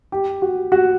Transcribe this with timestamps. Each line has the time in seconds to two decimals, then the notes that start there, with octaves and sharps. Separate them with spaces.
0.12 G4
0.42 F#4
0.72 F#4